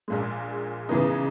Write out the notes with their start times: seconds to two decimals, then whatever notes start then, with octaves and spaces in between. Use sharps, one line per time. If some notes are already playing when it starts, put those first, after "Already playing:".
0.08 A#1 A#2 G#3
0.89 C#3 E3 B3 D#4